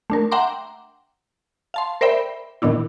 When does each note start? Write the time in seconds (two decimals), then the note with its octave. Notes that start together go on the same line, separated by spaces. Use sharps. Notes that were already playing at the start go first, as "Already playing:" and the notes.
0.10 A3 D4 A#4
0.31 E5 F#5 G5 A#5 C6 D6
1.74 F5 A5 C6
2.01 A#4 C5 D5 E5 G5 B5
2.62 A#2 D#3 B3 D4 E4